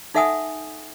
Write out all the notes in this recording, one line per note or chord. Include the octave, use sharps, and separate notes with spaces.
D#4 A4 E5 F#5 G#5 D#6